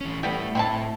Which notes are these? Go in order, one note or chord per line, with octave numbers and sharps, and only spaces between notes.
E3 C#4
G3 A3 B3 E4
A2 C4 E4 A5